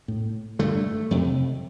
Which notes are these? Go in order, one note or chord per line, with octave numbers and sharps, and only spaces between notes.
A2
G2 D3 A3
F2 C3